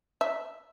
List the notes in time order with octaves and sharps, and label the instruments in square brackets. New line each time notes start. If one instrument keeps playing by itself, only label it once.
[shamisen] E5